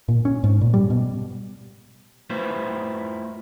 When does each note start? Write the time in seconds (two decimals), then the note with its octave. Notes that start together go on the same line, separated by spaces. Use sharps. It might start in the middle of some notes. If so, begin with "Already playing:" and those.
0.08 A#2
0.25 C#4
0.44 G#2
0.61 A#2
0.74 G3
0.90 B2
2.30 A3 E4 F4 B4 C5